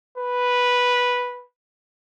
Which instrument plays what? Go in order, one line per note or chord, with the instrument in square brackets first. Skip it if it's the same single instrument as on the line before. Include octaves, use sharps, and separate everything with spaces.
[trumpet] B4